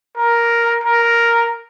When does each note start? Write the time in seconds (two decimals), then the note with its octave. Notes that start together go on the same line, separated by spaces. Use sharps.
0.16 A#4
0.84 A#4